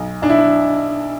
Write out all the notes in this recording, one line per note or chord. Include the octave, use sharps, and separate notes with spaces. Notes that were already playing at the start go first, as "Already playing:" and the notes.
Already playing: B1
B1 D4
E4
D4